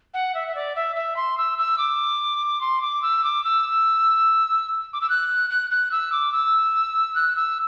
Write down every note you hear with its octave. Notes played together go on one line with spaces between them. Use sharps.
F#5
E5
E5
D5
E5
E5
C6
E6
E6
D6
C6
D6
E6
D6
E6
D6
E6
F#6
F#6
F#6
E6
D6
E6
F#6
E6